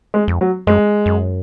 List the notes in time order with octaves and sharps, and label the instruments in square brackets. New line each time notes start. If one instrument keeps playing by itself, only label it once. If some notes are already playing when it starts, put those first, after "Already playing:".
[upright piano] G#3
[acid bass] F2
[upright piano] F#3
[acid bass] F#2 [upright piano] G#3
[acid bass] F#2